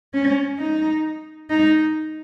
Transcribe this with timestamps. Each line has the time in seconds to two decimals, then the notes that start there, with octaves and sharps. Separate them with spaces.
0.14 C#4
0.59 D#4
1.50 D#4